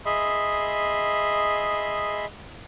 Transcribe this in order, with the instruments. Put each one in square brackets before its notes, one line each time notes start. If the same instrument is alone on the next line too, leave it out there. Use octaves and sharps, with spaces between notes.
[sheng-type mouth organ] G#4 D#5 E5 B5 C6